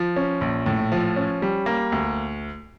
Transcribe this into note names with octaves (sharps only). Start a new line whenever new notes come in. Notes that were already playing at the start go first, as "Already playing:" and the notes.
Already playing: F3
C#4
A#1
A2
F3
C#4
G3
A#3
D2